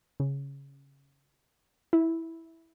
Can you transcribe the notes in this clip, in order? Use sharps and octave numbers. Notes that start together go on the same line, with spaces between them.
C#3
E4